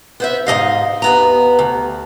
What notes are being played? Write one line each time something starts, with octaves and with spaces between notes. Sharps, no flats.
B3 C5 E5
G#2 F#3 D#5 F5
D#2 B3 A#5
D2